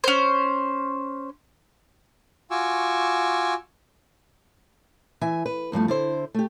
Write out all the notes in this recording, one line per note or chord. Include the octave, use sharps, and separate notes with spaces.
C#4 C5
F4 F#4 G#5 C#6 D6 E6
E3 E5 G#5
B4
E2 G2 F3 A3
D3 E4 C5
A3 G4